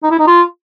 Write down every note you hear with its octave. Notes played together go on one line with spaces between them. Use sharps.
D#4
E4
D#4
F4